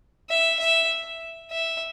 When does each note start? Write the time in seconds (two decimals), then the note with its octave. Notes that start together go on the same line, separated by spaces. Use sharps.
0.30 E5
0.60 E5
1.51 E5